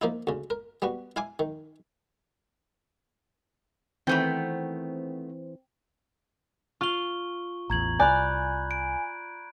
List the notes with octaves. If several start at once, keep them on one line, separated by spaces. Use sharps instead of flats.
F3 A#3 D#4 E4
D2 C#3
A#4
G3 B3 F#4
E4 F5 G#5 D6
D#3
D#3 E3 A3 B3 C4 C5 G5
F4 C#6 F6 G7
A1 E2 A#5 G#6 F#7
C2 D5 G#5 B5 F#6 G6
D7